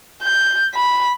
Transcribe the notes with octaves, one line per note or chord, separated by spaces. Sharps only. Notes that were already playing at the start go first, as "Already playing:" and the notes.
G6
B5